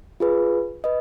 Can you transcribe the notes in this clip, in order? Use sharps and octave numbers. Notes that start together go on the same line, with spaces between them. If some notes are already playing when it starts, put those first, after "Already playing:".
F4 G#4 B4
B4 D#5